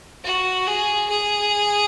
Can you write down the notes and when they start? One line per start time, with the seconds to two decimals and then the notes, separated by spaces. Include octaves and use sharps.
0.24 F#4
0.67 G#4
1.09 G#4